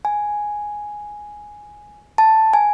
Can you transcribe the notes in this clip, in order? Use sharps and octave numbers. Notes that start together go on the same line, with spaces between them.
G#5
A5
G#5